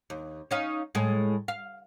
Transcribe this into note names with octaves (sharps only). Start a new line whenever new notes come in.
D#2
C#4 D#4 F5
A2 G#3
F5